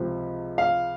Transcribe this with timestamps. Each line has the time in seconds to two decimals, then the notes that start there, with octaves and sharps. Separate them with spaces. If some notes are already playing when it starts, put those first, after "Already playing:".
Already playing: C#2 C3 F3
0.58 F5